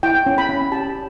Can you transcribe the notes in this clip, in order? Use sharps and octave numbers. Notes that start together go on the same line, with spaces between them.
E4 G5
C#4
B5
C#4
G4 A5